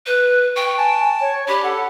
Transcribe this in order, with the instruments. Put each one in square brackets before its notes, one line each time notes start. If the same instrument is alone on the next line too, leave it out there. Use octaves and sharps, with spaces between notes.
[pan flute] B4
[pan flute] G5 [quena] C#6
[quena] G#5 [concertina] A5
[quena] C#5
[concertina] D4 [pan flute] G4 [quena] B5
[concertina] A4 [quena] F#5